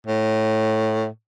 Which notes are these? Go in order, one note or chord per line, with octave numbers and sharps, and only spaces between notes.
A2